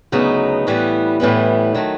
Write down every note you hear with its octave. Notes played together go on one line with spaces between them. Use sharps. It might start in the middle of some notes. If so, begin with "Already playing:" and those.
D2 C#3 F#3 B3 D#4
A2 E3 G3 B3
A2 E3 G3 B3
D#3 F#3 A3